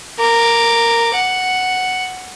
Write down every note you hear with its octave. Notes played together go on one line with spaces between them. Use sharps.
A#4 D6
F#5